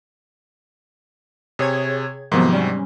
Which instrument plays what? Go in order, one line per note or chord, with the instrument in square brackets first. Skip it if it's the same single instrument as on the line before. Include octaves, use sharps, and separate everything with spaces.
[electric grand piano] C3 [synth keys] G#4 C#5 G#6
[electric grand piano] G#2 C3 F#3 [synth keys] D#3 F3 B3
[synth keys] G3 C#4